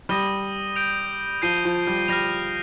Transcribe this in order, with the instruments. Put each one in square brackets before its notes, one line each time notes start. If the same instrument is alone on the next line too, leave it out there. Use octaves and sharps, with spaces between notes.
[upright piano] G3 [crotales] D#6 A#6 D#7 G7
[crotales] G6 D7 F7
[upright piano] F3 [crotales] G6 C7 D#7 G7
[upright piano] F3
G3
[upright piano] G3 [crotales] F6 A#6 F7